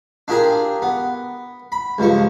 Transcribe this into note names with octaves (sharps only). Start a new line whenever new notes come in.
D4 F4 G4 G#4 A#4 G#5
B3
B5
C#2 G2 F3 C#6